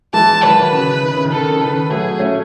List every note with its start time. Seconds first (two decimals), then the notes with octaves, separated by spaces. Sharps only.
0.13 E3 G#3 A5
0.43 D#3 F#3 B4
0.72 C#3 E3
1.03 D#3
1.13 C#3
1.25 D#3
1.32 A4
1.50 C#3
1.60 D#3 B4
1.90 F#3 A3 G#4
2.19 A3 C#4